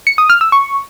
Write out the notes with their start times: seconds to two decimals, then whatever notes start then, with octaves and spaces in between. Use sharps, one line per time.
0.07 C#7
0.18 D#6
0.30 F6
0.41 E6
0.52 C#6